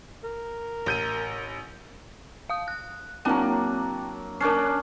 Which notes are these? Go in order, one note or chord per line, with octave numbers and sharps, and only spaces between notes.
A#4
A1 G6 D#7
F5 D#6
F#6
F#3 A#3 C4 D4 G5
C#4 D4 A#4 D5 C7